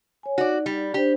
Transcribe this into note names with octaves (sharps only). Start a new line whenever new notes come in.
C#5 G#5
D#4 F#4 D5
G3
D4 G4 C5